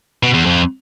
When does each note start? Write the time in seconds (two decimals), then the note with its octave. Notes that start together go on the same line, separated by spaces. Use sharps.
0.23 B2
0.34 E2
0.46 F2